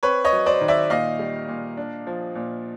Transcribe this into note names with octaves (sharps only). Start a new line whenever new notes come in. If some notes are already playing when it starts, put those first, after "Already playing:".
C4 B4 C#5
C#5 D#5
F#3
C5 D5
D#3
D5 E5
A#2 D#5 F5
G3
A#2
D4
F3
A#2